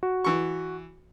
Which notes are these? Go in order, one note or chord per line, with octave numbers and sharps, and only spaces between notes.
F#4
E3 C#6